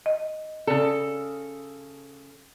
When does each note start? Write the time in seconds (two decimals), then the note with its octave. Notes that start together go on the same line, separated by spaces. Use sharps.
0.06 D#5
0.67 C#3 A4 D5